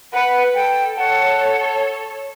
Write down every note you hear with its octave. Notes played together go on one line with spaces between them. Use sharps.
B4 F#5
A4 G5
A4 C#5 F#5